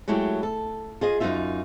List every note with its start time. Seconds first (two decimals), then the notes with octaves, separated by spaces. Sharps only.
0.08 F#3 G#3 A3 E4 G4
0.43 A4
1.01 F4 G#4 D#5
1.20 F#2 E3 D#4 F4 E5